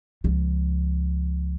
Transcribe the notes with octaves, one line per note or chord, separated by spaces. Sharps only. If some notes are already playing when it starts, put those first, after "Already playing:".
C#2 F3